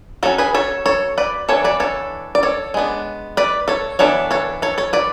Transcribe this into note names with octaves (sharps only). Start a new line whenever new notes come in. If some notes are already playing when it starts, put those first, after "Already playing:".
F#3 C#4 F#4 A4
G#4 B4
A4 C#5
A4 C#5
B4 D5
E3 B3 D4 A4 C#5
B4 D5
A4 C#5
D5
A4 C#5
G#3 B3 D4
B4 D5
A4 C#5
E3 B3 D4 A4 C#5
A4 C#5
A4 C#5
A4 C#5
B4 D5